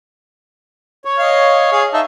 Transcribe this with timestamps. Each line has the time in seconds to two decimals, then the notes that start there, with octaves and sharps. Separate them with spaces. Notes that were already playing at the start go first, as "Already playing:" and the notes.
1.05 C#5
1.19 D#5 F5
1.72 G#4 F5
1.94 D#4 E5 A5